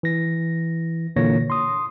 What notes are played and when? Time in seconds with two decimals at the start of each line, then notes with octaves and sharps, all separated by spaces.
0.03 E3 A#6
1.16 A#2 D3 E3 A#3 C#5 A#6
1.50 C6 D#6